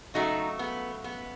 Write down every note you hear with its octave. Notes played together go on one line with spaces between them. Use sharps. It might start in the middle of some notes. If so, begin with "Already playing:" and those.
C#3 F#3 A3 D#4 F#4
B3
B3